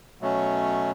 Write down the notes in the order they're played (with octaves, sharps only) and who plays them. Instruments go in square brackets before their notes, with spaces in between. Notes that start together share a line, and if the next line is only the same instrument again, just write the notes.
[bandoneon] B2 F#3 A3 C#4